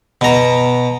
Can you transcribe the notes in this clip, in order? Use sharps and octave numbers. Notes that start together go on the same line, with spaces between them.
B2 A#5